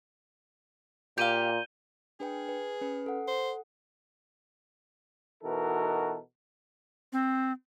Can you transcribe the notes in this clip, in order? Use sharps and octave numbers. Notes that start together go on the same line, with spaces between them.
A#2 G4 F5 G6 D#7 G7
D4 G#4 B4 G5
B4
C#4 B4
A4 F#5
C5
B2 E3 D#4 F#4 A4 A#4
C4